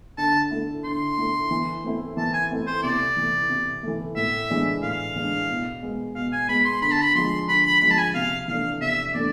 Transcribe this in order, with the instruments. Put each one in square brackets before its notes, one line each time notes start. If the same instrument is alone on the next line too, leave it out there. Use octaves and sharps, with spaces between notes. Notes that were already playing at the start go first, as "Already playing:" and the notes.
[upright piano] D3 [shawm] A5
[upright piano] A3 E4
[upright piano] D3 [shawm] C6
[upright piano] A3 E4
E3
A3 C4 E4
[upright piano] E3 [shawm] A5
[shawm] G#5
[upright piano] A3 C4 E4
[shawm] C5
[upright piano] C3 [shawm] D5
[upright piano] E3 A3
C3
E3 A3
[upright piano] A2 [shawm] E5
[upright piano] E3 G#3 D4
[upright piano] A2 [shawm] F5
[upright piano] E3 G#3 D4
B2
G#3 B3
[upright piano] B2 [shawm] F5
[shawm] G#5
[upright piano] G#3 B3 [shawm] B5
[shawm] C6
[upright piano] D3 [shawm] B5
[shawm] A5
B5
[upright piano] F3 G#3 [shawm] C6
[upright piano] D3 [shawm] B5
[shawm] B5
[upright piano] F3 G#3 [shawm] B5
[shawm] A5
G#5
[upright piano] C3 [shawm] F5
[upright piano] E3 A3 D4 [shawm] F5
[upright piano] C3 [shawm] E5
[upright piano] E3 A3 D4 [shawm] D5